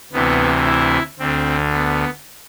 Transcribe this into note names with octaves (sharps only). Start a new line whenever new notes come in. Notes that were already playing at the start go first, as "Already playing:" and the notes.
D2 C3 E3 B3
E4
D2 D3 C4
B3